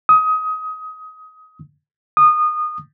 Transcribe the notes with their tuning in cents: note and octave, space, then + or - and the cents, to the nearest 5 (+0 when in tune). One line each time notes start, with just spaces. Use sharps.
D#6 +20
D#6 -25